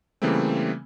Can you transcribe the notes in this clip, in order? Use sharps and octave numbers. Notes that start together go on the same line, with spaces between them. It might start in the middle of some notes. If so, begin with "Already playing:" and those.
C#3 E3 G3 A3 A#3 C4